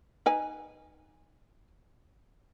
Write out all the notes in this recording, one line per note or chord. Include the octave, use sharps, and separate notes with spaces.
D#4 B4 G#5